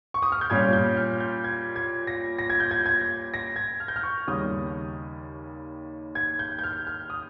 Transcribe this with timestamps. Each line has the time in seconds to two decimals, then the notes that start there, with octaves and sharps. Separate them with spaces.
0.14 C#6
0.22 D#6
0.32 F6
0.41 G6
0.50 A#2 G3 C#4 F4 G#6
0.73 G6
0.97 F6
1.20 G6
1.44 G#6
1.76 G#6
2.07 A#6
2.39 A#6
2.50 G#6
2.60 G6
2.71 G#6
2.86 G#6
3.34 A#6
3.56 G#6
3.80 F6
3.88 G6
3.96 F6
4.03 C#6
4.27 D#2 C#3 G3 C#4 D#6
6.15 G#6
6.39 G6
6.59 G6
6.64 F6
6.87 F6
7.10 D#6